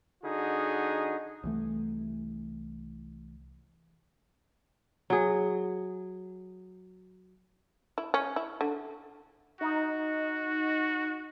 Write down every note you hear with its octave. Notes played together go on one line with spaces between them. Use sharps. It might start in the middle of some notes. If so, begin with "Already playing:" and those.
D3 D#4 F#4 G#4
C2 E3 A3
F#3 G#4
E4
C#4
E4
D3
D#4 F#4